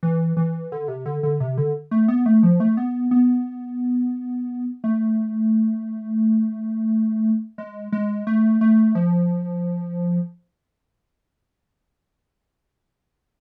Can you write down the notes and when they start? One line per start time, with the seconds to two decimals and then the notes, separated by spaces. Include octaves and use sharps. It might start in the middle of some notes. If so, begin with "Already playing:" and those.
0.03 E3
0.37 E3
0.72 D3
0.88 C3
1.06 D3
1.23 D3
1.40 C3
1.58 D3
1.91 A3
2.08 B3
2.26 A3
2.43 F3
2.60 A3
2.77 B3
3.11 B3
4.84 A3
7.58 G#3
7.92 G#3
8.27 A3
8.61 A3
8.95 F3